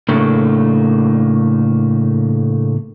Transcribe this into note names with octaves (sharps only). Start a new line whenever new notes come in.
A2 C#3 A3 A#3 D4